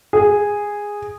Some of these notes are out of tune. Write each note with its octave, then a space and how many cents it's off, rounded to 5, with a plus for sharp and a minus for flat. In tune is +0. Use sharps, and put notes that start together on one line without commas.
G#4 -10